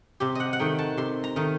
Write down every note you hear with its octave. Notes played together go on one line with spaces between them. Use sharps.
C3 G4
D#5 F#5
F#5
D#3 A3 D#4 G5
A5
C3 C6
A#5
D#3 A3 D#4